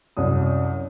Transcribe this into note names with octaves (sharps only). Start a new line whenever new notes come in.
C2 F#2 D#6